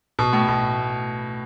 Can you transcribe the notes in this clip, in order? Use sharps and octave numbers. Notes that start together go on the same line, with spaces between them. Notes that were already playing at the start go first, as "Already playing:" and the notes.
B2
A2
B2